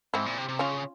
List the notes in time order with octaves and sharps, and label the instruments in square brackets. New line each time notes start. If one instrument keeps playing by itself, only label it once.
[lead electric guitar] G#2 [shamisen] C4 E4
[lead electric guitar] A#2
C3
C3
[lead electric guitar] C#3 [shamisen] C#4 F4